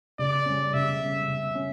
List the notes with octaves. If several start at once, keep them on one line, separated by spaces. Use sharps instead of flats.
C#3 D5
G3 C#4
C#3 E5
G3 C#4
C#3
C#4